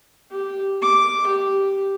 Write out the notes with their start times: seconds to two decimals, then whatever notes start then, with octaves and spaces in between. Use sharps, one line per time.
0.31 G4
0.82 D6
1.27 G4